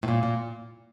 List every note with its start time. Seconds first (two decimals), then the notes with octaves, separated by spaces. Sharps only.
0.03 A2
0.08 A#2
0.23 A#2